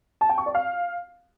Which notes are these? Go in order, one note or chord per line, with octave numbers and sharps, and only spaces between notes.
A5
G5
C#6
D5
F5